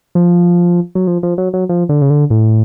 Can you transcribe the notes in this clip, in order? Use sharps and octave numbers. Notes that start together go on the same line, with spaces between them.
F3
F#3
F3
F3
F#3
F#3
F3
D3
C#3
D3
A2